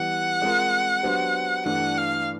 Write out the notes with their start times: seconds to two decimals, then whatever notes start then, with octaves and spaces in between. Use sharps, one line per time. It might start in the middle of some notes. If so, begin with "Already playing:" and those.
Already playing: E3 G3 B3 F#5
0.42 G#3 C4 F4 A#4
1.03 F#3 B3 D4 G4 C5
1.65 G2 E3 A3 D4 F#5
1.97 F5